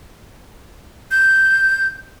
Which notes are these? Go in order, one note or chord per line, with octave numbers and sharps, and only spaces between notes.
G6